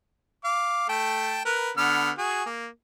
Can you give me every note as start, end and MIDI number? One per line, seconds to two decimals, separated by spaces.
0.44 0.87 77
0.44 0.87 86
0.89 1.44 57
0.89 1.44 79
0.89 1.44 81
1.45 1.71 70
1.45 1.71 71
1.77 2.10 50
1.77 2.10 59
1.77 2.10 89
2.18 2.43 66
2.18 2.43 68
2.46 2.67 58